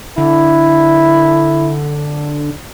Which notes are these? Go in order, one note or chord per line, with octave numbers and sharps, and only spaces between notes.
D3 E4